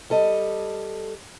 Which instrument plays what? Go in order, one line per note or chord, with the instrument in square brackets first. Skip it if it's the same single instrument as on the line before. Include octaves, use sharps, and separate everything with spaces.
[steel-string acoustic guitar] G3 A4 D#5